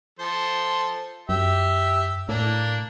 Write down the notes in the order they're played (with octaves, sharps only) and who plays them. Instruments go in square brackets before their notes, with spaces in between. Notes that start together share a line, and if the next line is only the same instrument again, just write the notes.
[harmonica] F3 A4 C5
[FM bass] F#2 [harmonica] G4 E5
[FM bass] A2 [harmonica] A#3 D4